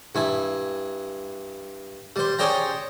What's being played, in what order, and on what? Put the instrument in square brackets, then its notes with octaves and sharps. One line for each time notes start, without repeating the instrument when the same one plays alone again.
[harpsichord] G2 E4 G#5
G3 C5
C#4 G#4 C5 D5 G5 A#5